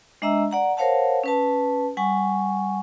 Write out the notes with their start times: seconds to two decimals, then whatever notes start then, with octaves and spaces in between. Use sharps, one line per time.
0.22 G#3 D4 D#5 E5 A#5 E6
0.51 D5 F#5 A#5
0.77 A#4 C5 C#5 F5 F#5 A5
1.24 C#4 B4 A5
1.97 G3 F#5 G#5 C#6